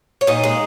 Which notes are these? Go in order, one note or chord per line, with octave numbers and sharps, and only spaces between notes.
C#5
A#2 D#4 D#5
G#3